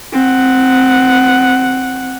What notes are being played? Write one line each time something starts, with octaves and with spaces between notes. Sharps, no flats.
C4 F#5